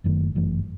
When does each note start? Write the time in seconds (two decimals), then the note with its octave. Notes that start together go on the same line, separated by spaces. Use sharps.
0.04 F#1 F#2 D#3 A3
0.35 G1 F#2 E3 A3